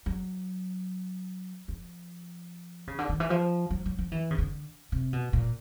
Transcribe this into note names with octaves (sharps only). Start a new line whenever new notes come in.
F#3
F3
C#3
D3
D#3
E3
F3
F#3
F#3
F3
E3
C#3
D3
C3
B2
A#2